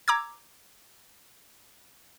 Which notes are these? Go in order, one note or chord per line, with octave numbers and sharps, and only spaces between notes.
A#5 D6 E6 G#6